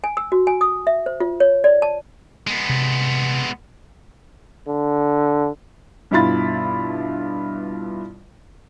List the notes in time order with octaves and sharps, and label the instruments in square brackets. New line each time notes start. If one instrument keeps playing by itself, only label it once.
[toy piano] G#5
E6
F#4
G#5
D#6
E5
C5
F4
C#5
D5
A5
[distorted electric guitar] G#3 B3
[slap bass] C3
[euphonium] D3
[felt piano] G2 B2 E4 F4 B5 A6